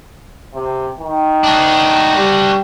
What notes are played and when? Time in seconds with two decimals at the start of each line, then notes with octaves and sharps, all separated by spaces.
0.54 C3
1.00 D#3
1.44 D4 F#4
2.16 G3